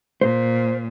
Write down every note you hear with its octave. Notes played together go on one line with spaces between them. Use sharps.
A#2 C5